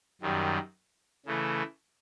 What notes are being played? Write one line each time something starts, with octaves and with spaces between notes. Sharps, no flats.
F#2 D#3 G3
C#3 E3 A3